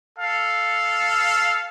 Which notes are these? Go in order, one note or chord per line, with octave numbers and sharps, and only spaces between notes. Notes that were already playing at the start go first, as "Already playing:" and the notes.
A4 F5